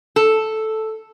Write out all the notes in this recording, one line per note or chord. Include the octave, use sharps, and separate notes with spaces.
A4